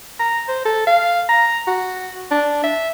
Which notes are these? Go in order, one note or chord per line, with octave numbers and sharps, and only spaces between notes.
A#5
C5
A4
F5
A#5
F#4
D4
E5